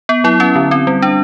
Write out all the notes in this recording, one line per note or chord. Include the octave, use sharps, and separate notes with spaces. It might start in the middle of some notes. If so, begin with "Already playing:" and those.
B3
F#3 E4
C#4 E4
D3
C4
G3
D4